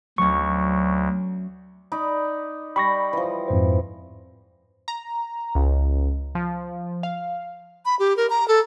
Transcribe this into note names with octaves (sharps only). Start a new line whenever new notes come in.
D2 F#3 C#4 C#6
D#4 D5 B5
G3 B5 C#6 A#6
E3 F3
F2 G#2 C5
A#5
C#2
F3
F5
B5
G4
A#4
A#5
A4